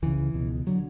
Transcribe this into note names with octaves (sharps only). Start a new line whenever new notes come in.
C#2 C#3 E3
C#2 B2
D3 F#3